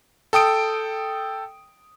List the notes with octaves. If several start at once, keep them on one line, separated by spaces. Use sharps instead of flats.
A4 G5 D#6 D7